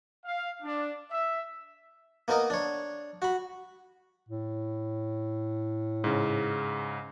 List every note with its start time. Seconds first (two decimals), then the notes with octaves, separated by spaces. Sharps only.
0.25 F5
0.62 D4
1.10 E5
2.28 A#3 B3 D#4 A#4 D#5
2.50 D4 C#5
3.22 F#4 B5
4.29 A2
6.04 G#2 C#3